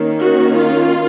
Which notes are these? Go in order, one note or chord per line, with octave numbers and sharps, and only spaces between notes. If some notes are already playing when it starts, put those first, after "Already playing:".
Already playing: D#3 A#3 C#4
F#4
F4